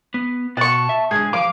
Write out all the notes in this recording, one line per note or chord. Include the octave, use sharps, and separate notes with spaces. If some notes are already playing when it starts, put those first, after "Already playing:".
B3
B2 F#5 A5 C#6
E5
G#2 D3 G#4
F3 F5 D6